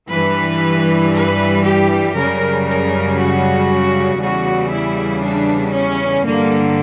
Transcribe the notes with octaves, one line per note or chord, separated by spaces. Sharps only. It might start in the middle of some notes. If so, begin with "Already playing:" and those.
G2 E3 G3 B4
B4
G4
F#2 C#3 G3 A#4
A#4
F#4
E2 C#3 E3 G3 F#4
E4
D4
C#4
G2 D3 G3 A#3